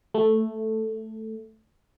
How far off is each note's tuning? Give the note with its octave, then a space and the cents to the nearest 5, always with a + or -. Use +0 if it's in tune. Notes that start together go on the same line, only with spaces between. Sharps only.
A3 -5